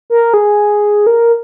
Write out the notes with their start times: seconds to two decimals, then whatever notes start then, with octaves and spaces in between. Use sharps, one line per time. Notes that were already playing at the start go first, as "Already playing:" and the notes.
0.10 A#4
0.34 G#4
1.07 A#4